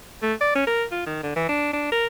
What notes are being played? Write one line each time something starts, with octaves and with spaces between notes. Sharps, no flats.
A3
D5
C#4
A#4
F4
D#3
D3
E3
D4
D4
A#4